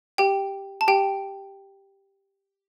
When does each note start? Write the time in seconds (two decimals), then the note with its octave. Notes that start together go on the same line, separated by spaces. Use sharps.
0.18 G4 G5
0.81 A5
0.88 G4 G5